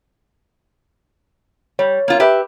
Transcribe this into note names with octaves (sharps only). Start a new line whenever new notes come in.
G3 C#5
A#3 F4
G4 B4 E5